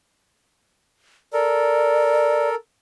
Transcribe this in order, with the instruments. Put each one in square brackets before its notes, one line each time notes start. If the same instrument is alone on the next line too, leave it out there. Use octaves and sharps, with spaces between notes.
[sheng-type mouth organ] A4 A#4 [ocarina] D5